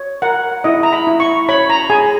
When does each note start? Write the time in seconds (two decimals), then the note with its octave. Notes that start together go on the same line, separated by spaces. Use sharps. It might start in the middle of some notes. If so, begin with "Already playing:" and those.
Already playing: C#5
0.22 A#4 F#5
0.64 E4 D#5
0.83 A#5
0.93 B5
1.07 E4
1.20 C#6
1.49 C#5 B5
1.70 A#5
1.90 G#4 G#5